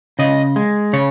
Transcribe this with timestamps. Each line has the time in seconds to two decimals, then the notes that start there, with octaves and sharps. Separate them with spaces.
0.19 C#3 D#5
0.56 G#3
0.93 C#3 C#5